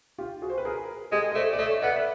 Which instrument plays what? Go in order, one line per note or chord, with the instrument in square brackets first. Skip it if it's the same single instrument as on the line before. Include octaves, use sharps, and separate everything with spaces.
[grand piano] F4 G4
F#4 G#4
C5
B4
G#4 A#4
[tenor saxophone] G#3 [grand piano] G4 A4
[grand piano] D#5
[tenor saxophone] A3 [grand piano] C5 D5
[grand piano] D5
[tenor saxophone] A3 [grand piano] C#5 D#5
[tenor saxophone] B3 [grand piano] D5 E5
[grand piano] E5